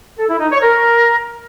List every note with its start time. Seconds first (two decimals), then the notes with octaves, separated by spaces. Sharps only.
0.17 A4
0.28 E4
0.40 D#4
0.51 C#5
0.63 A#4